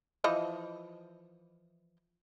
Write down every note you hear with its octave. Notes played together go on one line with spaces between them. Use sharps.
E3 F3 D#5